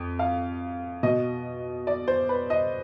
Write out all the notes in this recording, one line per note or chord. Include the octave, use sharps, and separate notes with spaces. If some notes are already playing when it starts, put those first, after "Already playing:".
Already playing: F2
F5
B2 D#5
D5
C5
B4
D#5